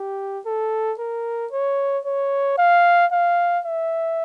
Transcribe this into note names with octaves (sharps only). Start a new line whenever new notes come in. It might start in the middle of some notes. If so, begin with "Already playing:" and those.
Already playing: G4
A4
A#4
C#5
C#5
F5
F5
E5